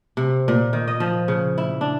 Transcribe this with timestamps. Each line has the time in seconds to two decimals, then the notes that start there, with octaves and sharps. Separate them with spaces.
0.17 C3
0.48 A#2
0.73 D#3
0.88 D#5
1.00 F3
1.28 C#3
1.58 E4
1.81 D4